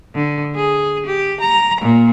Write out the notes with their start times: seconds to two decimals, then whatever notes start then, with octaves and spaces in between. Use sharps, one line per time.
0.14 D3
0.54 G#4
1.06 G4
1.40 A#5
1.81 A#2